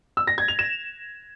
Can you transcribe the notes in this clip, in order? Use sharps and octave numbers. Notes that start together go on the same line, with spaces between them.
E6
A#6
G#6
F7
E7